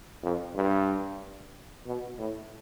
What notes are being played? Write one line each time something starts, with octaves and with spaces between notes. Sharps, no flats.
F2
G2
B2
A2